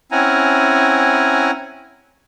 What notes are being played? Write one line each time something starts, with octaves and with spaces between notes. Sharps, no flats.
C4 C#4 E4 F#5 G#5 A#5